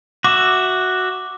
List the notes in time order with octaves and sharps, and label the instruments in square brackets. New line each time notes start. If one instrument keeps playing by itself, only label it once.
[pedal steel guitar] F#4 E5 [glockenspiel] D6